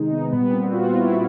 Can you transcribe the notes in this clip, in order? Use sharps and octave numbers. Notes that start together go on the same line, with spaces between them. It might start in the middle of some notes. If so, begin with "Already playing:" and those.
Already playing: C3 D#3 G#3 D#4
B3
A#2 G3 B3
C4
F#4
F4
E4